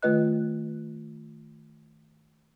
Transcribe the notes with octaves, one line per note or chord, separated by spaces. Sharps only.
D#3 A3 F4 B4 D#5 F#6